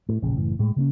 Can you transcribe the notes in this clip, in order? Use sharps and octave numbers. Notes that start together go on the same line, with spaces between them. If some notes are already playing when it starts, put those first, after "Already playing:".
A2
E1 A#1 A#2 C#3
F#1 A2 E3
A2 G#3
C#3 A#3 C#4